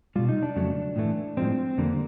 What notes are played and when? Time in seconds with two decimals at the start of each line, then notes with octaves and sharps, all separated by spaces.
0.16 B2 G3 F4
0.29 D#4
0.43 D4
0.56 F2 C#3 F#3 A3
0.96 A2 E3 A3
1.37 A2 F3 G#3 C4
1.78 F2 D3 G3 A#3